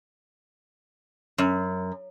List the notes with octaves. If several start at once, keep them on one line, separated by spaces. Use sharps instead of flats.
F#2